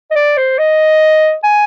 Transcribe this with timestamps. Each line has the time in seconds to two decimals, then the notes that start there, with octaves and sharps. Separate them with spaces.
0.11 D#5
0.16 D5
0.37 C5
0.58 D#5
1.44 G#5